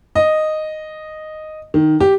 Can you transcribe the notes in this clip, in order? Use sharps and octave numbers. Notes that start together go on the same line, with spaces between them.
D#5
D#3
G4